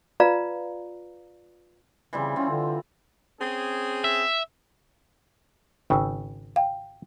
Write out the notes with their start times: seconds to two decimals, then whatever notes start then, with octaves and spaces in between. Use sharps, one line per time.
0.20 F4 B4 D5 F5 A#5
2.13 C#3 E3 G3 C4
2.36 C4 C#4 F4
2.50 D3
3.41 C4 C#4 G#4
4.04 E5
5.90 G#1 C#3 G5 E6
6.56 F5 G5